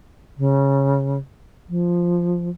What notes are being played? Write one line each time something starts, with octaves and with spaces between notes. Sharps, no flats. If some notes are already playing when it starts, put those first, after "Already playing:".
C#3
F3